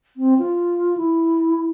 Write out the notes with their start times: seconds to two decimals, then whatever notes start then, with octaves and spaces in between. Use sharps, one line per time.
0.17 C4
0.39 F4
0.97 E4